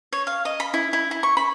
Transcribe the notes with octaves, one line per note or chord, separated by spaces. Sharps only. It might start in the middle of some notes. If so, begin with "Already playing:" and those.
C#5
F5
D#5
B5
E4
E4
E4
C#6
B5